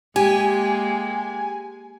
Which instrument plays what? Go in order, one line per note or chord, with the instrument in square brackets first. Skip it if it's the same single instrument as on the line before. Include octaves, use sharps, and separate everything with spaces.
[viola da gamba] G#3 A#3 [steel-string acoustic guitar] G4 [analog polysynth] G#5